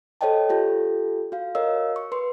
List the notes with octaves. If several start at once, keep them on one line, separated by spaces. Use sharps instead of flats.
A4 C5 C#5 D#5 G5 A5
F4 G4 A4
F#4 F5
A#4 C#5 D#5 F5 E6
C#6
B4 C6